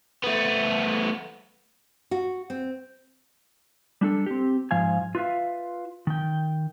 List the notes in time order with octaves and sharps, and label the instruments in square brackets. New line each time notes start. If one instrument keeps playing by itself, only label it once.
[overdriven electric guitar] A3 B3
[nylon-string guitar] F#4
C4
[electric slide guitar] G3 D4 A4
C4 G4
G#2 F3 F5 G#5
F4 B4 E5 F5
D#3 G5